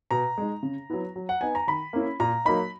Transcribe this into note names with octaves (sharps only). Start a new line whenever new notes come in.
B2 A#5
G#3 D#4
C#3
F#3 B3 E4
F#3
F#5
B3 D#4 G#5
A#5
D#3 B5
A#3 C#4 E4
A#2 A#5
F#3 A#3 D#4 B5